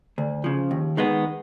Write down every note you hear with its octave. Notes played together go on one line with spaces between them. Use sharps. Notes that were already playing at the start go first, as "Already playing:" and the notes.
D2
C#3 F3
D#2
D#3 G#3 B3